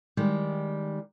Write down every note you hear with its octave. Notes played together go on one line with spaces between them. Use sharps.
D#3 G3 G#3